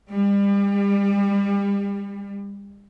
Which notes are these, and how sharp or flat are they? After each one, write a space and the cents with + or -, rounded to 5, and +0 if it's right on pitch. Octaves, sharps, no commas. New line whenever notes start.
G3 +35